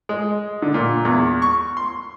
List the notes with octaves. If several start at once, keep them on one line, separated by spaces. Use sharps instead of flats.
G#3
D3
A#2
E2
C#6
C6